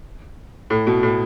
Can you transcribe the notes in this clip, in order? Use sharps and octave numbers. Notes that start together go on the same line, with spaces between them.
A2
B2
A2